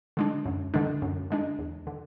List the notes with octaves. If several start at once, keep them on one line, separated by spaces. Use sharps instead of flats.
D3 G#3 D4
F#2
D3 G#3 D4
F#2
D3 G#3 D4
E2
D3